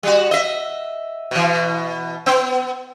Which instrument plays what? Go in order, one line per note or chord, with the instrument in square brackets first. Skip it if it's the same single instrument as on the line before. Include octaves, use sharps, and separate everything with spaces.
[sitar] G3 F#4
D#5 E5
B2 E3
B3